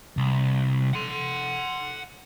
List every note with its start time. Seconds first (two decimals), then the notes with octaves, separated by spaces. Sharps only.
0.17 C2
0.94 F#5 C6